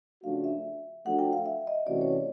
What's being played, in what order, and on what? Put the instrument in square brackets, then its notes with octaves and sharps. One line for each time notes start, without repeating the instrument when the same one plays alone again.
[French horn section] C#3 F3 A3 D4 F#4 [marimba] F5
[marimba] E5
[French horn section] F3 A3 D4 F#4 A4 [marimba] F#5
[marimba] G5
F5
E5
D#5
[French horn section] C3 E3 A3 C#4 F#4 [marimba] D5
[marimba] C#5